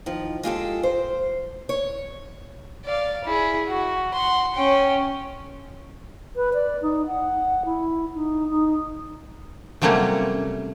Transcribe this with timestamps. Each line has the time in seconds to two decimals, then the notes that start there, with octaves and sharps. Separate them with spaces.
0.06 D#3 F3
0.43 G#3 F4 G4 A4
0.83 C5
1.69 C#5
2.85 D5 F5
3.25 E4 G#4
3.68 F#4
4.14 F#5 C6
4.55 C#4 G5
6.36 B4
6.54 D5
6.82 D#4
7.06 F#5
7.65 E4
8.15 D#4
8.49 D#4
9.82 C3 F#3 G3 A3 A#3 C#4